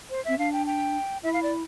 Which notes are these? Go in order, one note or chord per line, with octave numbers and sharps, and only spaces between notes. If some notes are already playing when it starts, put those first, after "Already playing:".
C5
C4 E5
D4 F5
G5
G5
E4 E5
F5
D5